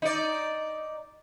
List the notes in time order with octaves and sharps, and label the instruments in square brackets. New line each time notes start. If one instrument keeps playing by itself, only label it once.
[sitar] D#4 D5